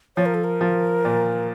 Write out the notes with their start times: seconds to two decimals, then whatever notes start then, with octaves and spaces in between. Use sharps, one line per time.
0.16 F3 C#5
0.26 A#4
0.34 A4
0.44 A#4
0.61 F3
1.05 A#2